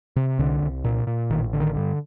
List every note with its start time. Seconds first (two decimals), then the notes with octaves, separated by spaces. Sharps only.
0.16 C3
0.39 C2 D3
0.62 C2
0.84 A#2
1.07 A#2
1.30 A1 D#3
1.53 D3
1.60 D#3
1.76 G2